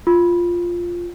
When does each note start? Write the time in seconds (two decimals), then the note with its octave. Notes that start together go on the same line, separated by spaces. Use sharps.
0.07 F4